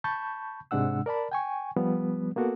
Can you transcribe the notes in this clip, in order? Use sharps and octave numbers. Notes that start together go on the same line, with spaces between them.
A5 B5 C#6 G6
G#2 C3 G#3 D4 F#5 E6
A#4 D5 A5 B5
G5 G#5 C#6
F3 G3 B3
A#3 B3 F#4 A4 A#4